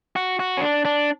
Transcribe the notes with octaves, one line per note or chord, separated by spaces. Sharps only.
F#4
F#4
C#4
D4
D4